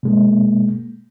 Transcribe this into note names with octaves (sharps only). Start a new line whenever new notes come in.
B2 G#3 A#3